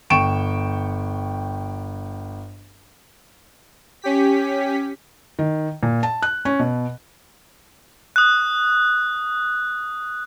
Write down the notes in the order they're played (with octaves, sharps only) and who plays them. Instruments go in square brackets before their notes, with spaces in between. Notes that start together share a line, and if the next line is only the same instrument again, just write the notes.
[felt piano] G1 G5 C#6 D7 E7
[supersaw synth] C#4 G4 B6
[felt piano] D#3
A#2
A5
F#6
C#4
B2
[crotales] D#6 F#6